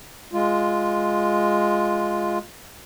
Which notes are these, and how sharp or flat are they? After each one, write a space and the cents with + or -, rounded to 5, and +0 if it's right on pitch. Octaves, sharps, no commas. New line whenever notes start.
G#3 +0 F4 +0